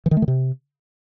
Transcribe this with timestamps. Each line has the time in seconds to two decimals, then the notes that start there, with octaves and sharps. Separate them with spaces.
0.06 E3
0.11 D#3
0.17 A3
0.22 D#3
0.28 C3